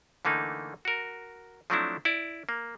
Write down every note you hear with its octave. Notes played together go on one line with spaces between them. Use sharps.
D3 E3 A3 A#3 D#4
F#4 A#4
F3 F#3 A3 C4 D4 E4
E4 D5
A#3